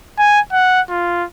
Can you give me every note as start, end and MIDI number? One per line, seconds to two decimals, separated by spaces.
0.18 0.40 80
0.52 0.81 78
0.90 1.24 65